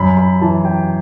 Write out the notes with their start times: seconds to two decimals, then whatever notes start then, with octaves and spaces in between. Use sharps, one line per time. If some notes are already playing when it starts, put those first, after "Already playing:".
Already playing: F#2 B5
0.17 B5
0.42 E3 A5
0.65 G5